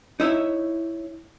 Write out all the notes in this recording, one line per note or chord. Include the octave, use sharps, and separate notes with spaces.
D#4 E4 C#5 E5